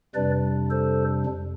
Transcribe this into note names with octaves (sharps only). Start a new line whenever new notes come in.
F2 C3 G3 D4 B4 D5
A4 C5
F2